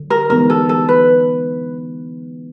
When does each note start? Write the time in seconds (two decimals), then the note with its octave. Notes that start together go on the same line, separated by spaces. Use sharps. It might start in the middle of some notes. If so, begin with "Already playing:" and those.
Already playing: D3 F#3
0.10 A#4
0.30 E3 G#3 B3 D#4 A#4
0.50 A4
0.69 A4
0.89 B4